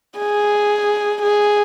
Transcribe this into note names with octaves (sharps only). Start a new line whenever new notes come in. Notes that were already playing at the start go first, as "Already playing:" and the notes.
G#4
G#4